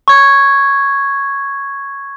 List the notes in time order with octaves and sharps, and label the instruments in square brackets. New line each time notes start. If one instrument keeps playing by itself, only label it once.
[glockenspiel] C#6 G#6